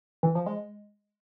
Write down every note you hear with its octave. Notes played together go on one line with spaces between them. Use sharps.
E3
F3
G#3